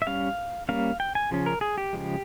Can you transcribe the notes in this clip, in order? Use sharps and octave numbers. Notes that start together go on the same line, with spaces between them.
E5
G3 C#4 F5
G3 A#3 C#4 F5
G5
G#5
C#3 F3 C#4
A#4
G#4
G4
C#3 F3 G#3